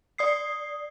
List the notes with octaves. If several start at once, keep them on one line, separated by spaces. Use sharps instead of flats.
D5 D#6 C7